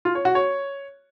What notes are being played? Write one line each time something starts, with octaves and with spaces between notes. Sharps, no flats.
F4
C#5
F#4
C#5